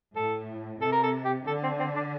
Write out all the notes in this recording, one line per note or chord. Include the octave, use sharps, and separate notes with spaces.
A2 A4
C3 A4
A#4
A4
G4
D3 A4
C4
C4
D4